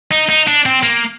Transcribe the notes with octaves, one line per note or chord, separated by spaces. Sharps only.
D#4
D#4
D4
C4
A#3